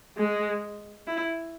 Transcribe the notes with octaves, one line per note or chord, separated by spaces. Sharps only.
G#3
E4